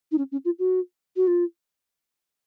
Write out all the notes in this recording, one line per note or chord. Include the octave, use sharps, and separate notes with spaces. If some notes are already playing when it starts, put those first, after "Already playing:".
D#4
C#4
C#4
F4
F#4
F#4
F4